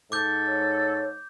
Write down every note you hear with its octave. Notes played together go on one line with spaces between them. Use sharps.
G#2 A4 D6 G6
C#5